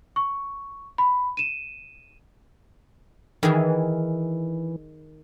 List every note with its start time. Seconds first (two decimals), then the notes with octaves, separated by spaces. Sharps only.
0.16 C#6
0.98 B5
1.37 D#7 E7
3.43 D#3 E3 G#4